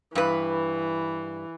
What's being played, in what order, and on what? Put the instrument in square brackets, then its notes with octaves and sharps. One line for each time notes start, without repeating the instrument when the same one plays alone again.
[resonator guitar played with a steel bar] G2 B4 [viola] E3